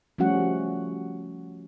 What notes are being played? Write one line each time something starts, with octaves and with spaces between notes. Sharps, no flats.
F3 G3 A3 C#4 F#4 F#5